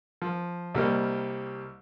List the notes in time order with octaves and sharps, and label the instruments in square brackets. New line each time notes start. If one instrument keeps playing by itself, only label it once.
[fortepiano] F3
C2 G3 A#3 D#5